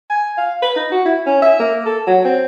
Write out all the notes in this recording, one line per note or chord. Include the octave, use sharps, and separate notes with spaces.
G#5
F5
B4
D#4
F#4
E4
C#4
E5
A#3
A4
F#3
C4